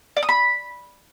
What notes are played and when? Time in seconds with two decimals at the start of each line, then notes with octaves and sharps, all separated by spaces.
0.17 D5
0.23 D#6
0.29 B5